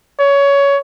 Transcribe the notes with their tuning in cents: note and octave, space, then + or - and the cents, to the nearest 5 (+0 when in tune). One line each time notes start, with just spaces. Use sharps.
C#5 +20